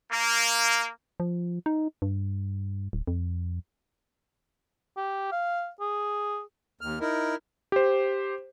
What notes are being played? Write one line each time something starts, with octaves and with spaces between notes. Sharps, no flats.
A#3
F3
D#4
G2
D1
F2
G4
F5
G#4
D#2 F6
D#4 E4 A#4
G4 C5